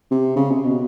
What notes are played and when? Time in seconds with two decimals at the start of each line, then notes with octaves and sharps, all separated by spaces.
0.11 C3
0.36 C#3
0.51 C3
0.64 B2